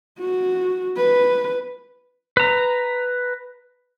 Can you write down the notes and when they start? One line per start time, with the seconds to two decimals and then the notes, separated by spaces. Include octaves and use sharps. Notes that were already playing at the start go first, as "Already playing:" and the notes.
0.19 F#4
0.96 B4
2.37 B4 A#5